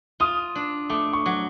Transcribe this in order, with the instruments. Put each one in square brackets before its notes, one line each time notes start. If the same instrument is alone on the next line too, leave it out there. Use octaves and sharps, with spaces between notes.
[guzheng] F4 [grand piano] D#6
[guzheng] D4
[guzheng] A3 [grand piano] D6
[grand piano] C#6
[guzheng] F#3